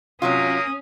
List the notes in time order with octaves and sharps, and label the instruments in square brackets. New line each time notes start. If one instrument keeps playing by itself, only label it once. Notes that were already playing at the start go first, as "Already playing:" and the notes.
[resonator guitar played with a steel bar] C3 F#3 F4 [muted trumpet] A#3 [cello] C#4 [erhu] D#6